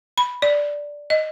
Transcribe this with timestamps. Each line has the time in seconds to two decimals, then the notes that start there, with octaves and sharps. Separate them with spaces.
0.18 B5
0.42 D5
1.10 D#5